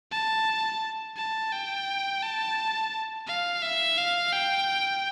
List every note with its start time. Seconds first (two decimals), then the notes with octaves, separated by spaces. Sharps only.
0.11 A5
1.16 A5
1.52 G5
2.22 A5
3.27 F5
3.62 E5
3.97 F5
4.33 G5